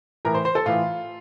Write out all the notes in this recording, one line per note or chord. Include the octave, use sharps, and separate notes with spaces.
A2 E3 A#4
C5
C5
A4
A2 E3 F4